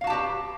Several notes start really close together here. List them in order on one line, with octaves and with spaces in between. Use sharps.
F5 F#4 A5 G4 B4